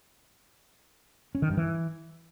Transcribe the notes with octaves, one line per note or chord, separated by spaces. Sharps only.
C#4
D#3
G2
E3